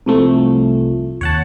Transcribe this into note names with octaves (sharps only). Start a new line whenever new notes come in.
C2 F3 A3
D#2 C#5 F#5 A5